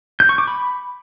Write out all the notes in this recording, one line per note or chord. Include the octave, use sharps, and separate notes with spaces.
G6
C#6
D6
B5